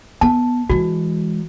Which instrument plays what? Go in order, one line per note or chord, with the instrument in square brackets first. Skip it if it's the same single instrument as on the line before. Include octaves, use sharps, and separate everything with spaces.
[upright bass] B3 [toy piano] A5
[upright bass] E3 G#3 [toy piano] F#4